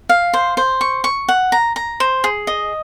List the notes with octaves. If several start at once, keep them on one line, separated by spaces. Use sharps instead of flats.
F5
C5
C5
C#6
C#6
F#5
A#5
A#5
C5
G#4
D#5